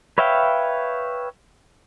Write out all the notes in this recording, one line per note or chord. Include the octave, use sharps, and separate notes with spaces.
B4 C#5 E5 F5 G5